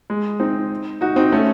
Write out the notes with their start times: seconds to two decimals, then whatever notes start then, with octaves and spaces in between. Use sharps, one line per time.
0.10 G#3
0.40 C4 D#4
1.01 D#4 F#4
1.16 C4 D#4
1.32 A3 C#4